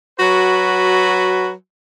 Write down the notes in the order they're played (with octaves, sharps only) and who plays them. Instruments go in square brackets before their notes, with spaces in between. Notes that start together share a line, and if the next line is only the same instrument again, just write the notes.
[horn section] F#3 F#4 B4